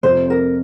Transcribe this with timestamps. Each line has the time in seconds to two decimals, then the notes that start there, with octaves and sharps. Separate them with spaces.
0.03 F2 C3 F3 A3 C5
0.30 A#4